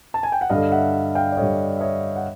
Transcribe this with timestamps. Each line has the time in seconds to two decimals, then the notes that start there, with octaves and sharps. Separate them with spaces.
0.14 A5
0.23 G#5
0.32 G5
0.41 F#5
0.50 G2 D3 D#5 F5
0.72 E5 F#5
1.15 F5 G5
1.32 D5
1.37 G2 D3 C#5 D#5
1.77 E5
1.81 C#5 D#5
2.16 F#5